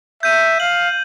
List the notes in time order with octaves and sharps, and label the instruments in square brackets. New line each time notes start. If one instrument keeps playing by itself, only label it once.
[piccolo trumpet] E5 [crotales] G6 D#7
[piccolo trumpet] F5 [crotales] F#7